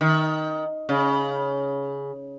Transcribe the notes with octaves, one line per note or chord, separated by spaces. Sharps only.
D#3
C#3